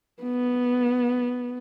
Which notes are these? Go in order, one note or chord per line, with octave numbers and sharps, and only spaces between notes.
B3